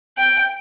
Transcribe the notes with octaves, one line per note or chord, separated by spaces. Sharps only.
G5